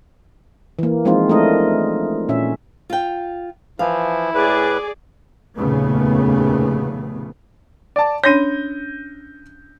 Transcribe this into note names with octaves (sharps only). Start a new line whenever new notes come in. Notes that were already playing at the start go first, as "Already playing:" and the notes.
E3 A#3
F3 G#3 C4 D#4 F4
A3 D4 E4 A#4 D#5
A#2 C#4 E5
F4 G5
E3 F3 E4 F5
A2 G#4 B4 D5
F1 D#2 A#2 C#3 A3 B3
D5 A5
C#4 D4 C#5 G6 A#6 D#7